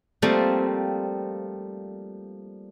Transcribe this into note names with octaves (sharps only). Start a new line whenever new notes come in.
F3 G3 A3 A#3 C4